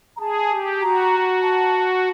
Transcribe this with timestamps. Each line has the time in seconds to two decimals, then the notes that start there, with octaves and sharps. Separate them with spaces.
0.16 A#5
0.20 G#4 A5
0.51 G4
0.81 F#4 A#5
1.42 A5